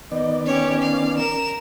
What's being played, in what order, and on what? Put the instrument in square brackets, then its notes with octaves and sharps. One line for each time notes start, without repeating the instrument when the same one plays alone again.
[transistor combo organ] D#3 B3 D5 [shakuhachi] D#5
[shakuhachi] C#4 [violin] G4 C#5
[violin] F5
A#4 E7